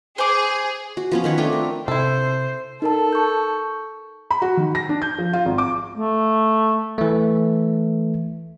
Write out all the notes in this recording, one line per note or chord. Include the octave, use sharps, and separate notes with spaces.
G#4 C5 D6
F#4
F3 B3 C#4
D#3 B4 C#5
A3 C4 D4 F4
A#4
C3 E4 A4 C5
D#4 A4 A#4 A5
C#6 G6
B5
F#4
D#3
A#6
D4
G6
F3
F4
G#1
D6
A3
E3 A3